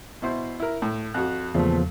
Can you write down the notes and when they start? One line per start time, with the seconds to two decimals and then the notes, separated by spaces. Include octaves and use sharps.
0.22 B2 E4 C5
0.60 E4 A#4
0.82 A2
1.14 F2 F#4 F#6
1.54 E2 A#2 C#3 F3 A3